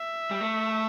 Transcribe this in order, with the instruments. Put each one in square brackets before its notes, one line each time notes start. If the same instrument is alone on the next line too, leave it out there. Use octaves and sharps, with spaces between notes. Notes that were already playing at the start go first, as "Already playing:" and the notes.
Already playing: [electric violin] E5
[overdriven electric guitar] G3
A3